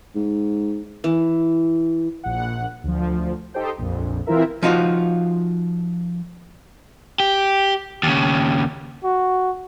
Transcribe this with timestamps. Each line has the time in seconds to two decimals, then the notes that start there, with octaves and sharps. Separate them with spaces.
0.16 G#2
1.04 E3
2.24 A#1 F#5
2.84 D2 F3
3.54 D#4 G4 A4 C5 G5
3.78 A#1 F2
4.26 E3 C4 E4 F4 A#4 E5
4.63 F3 D#4 F4 F#4
7.20 G4
8.03 D#2 C#3
9.04 F#4